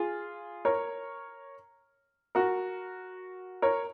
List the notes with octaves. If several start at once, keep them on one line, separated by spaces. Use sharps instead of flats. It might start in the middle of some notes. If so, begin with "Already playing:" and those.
Already playing: F4 G#4
A#4 C#5
F#4 A#4
A#4 C#5